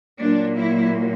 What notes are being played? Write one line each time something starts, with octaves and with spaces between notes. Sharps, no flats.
A#2 F#3 A#3 D4
E4